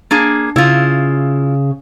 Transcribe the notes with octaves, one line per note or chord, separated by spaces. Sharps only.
A#3 D4 G#4
C#3 E4 F4